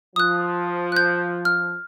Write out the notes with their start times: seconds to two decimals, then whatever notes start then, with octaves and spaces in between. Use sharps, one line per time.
0.16 F3 D#6 F#6
0.92 F#6 G6
1.45 F6